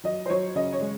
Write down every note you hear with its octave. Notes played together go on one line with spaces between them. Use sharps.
F#3 D#5
C5
F#3 C#5
C#3 D#5
C#5
G#3